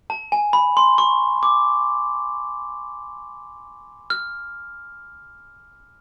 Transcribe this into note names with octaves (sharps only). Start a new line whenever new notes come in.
A5
G#5
B5
C6
C#6
D6
F6